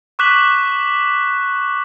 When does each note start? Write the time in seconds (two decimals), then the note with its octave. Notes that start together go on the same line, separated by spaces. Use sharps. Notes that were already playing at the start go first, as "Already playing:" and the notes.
0.19 C#6 D6 F#6 B6 E7 F#7